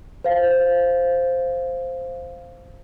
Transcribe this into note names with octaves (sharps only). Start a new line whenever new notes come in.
C5 F5